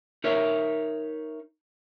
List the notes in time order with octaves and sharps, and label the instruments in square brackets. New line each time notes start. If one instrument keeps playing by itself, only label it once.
[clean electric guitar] D#4 A#4 C#5 E5